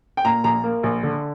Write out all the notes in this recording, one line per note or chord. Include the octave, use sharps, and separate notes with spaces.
G5
A#2 A#5
A#1 A#5
A#3
A#1
D3